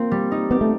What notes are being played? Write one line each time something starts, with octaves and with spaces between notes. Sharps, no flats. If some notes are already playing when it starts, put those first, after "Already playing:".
Already playing: A#3 C4 F4
G3
D#4
B3 G4
A3